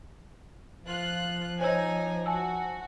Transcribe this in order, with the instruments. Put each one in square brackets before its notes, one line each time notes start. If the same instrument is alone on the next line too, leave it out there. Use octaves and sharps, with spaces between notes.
[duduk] F3 [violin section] F4 F#6
[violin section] D#4 G#5 [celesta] C5 C#5 E6
[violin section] F#4 [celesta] G#5 A5 E6